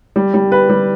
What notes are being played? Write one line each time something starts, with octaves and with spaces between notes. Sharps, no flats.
G3
G3
B4
G3